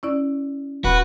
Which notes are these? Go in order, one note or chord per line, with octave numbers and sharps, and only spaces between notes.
C#4 E4 D5
D#1 F#4 B4